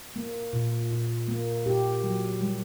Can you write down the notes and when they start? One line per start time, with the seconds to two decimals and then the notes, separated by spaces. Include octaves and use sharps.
0.16 A#3
0.53 A#2
0.91 A#2
1.28 A#3
1.66 A#2 G4
2.03 F#3
2.41 G3